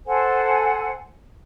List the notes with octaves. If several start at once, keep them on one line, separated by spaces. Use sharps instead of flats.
A4 C5 F#5 G#5